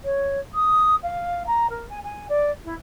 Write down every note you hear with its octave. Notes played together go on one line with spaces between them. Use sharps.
C#5
D#6
F5
A#5
A#4
G#5
G#5
D5
E4